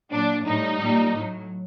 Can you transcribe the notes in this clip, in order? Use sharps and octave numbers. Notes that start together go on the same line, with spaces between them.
A#2 F#3 D4
A2 G3 D#4
A#2 G3
A2 F#3